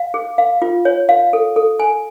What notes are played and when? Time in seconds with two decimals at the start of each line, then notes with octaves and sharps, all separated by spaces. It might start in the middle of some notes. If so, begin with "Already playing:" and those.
Already playing: F5
0.14 G#4
0.38 F5
0.62 F4
0.85 C#5
1.09 F5
1.33 A4
1.56 A4
1.80 G#5